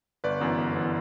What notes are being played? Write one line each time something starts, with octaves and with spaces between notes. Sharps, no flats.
G1 B4 D5
F#2 E3 B3
G1
E3 B3